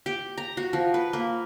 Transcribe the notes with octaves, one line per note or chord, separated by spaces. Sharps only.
G4
A#5
F#4
F3
B4
A#3